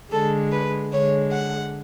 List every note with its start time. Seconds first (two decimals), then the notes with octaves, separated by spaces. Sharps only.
0.11 D3 G#3 A4
0.52 B4
0.92 D3 G#3 C#5
1.32 F#5